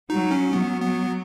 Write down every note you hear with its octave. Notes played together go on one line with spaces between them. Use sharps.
F#3 D#4
C#4
F#3 B3
F#3 B3